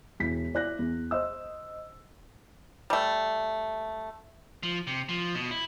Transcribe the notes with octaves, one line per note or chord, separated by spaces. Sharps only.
E1 E3 B6
E4 D5 F#6 A#6
E2
C5 D#5 E6
G3 A3
F3
C3
F3
B2
E4